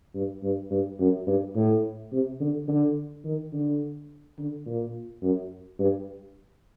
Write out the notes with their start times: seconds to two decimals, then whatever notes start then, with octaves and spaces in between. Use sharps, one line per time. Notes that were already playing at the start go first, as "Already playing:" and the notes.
0.15 G2
0.43 G2
0.71 G2
0.99 F#2
1.27 G2
1.56 A2
2.12 C3
2.41 D3
2.68 D3
3.25 D#3
3.53 D3
4.38 D3
4.66 A#2
5.22 F#2
5.79 G2